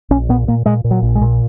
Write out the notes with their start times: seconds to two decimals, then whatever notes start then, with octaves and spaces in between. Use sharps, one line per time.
0.10 A#1 C#4
0.29 A#2 B3
0.48 A#2 A#3
0.66 A#2 G#3
0.84 A#2
0.91 F#3
1.03 A#1
1.15 G#3
1.21 A#2